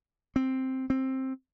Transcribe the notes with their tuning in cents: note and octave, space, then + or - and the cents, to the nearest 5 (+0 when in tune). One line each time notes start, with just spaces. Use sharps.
C4 +5
C4 +10